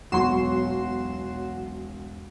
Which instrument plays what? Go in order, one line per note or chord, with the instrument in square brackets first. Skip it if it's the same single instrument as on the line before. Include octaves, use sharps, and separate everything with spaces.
[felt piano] E1 [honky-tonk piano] B1 C#6 [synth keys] F#3 C7 E7 [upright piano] F#4 C6